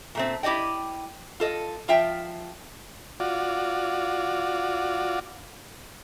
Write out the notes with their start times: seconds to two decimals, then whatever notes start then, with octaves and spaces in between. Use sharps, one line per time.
0.15 A#2 A3 C4
0.43 E4 G4 D5 D#5 G5
1.40 F4 A4 D#5
1.88 F3 F4 E5 G5
3.20 F4 F#4 D5